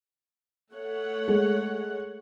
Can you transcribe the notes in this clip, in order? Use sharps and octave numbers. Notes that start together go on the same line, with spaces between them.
A3 C#5 F#5
G#3